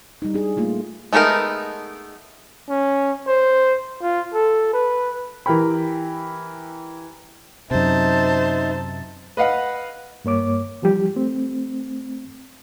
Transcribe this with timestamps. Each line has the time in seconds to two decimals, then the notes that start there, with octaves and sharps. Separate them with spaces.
0.22 G3 D#4
0.34 D4 G#4
0.57 A3 A#3 F4
1.13 G#3 A3 B3 D#4 A#4
2.69 C#4
3.27 C5
4.02 F4
4.34 A4
4.73 B4
5.46 E3 G4 A#4 G5 B5
7.71 F#2 C3 D#4 C5 E5 A5
9.37 B4 D#5 F5 F#5
10.25 G2 A#3 C#5 D6
10.82 E3 F3 G3 G4
11.16 A3 C4